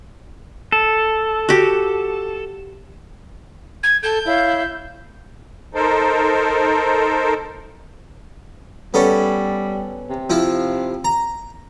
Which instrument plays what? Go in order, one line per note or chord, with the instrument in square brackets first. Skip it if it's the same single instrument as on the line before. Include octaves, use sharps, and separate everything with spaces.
[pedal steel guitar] A4
[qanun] F#4 G4
[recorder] G#6
[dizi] A4 [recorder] G6
[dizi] E4 [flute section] C#5 F5
[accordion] D#4 A4 A#4 C5
[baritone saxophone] G3 [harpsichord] B3 C#4 A4
[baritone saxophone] C3
[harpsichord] F3 E4 F4
A#5